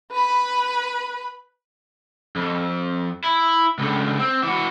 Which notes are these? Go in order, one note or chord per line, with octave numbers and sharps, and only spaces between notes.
B4 B5
F2
E4
C#2 D3
C4
E3 F#4